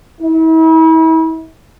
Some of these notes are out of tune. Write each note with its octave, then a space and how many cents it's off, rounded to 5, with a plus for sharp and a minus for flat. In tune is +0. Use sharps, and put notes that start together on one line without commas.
E4 -40